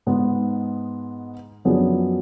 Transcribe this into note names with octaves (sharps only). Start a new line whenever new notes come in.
G#2 G#3 B3
F#2 F3 B3 D4 G#4